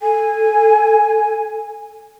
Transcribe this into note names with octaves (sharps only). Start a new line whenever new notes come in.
A4 G#5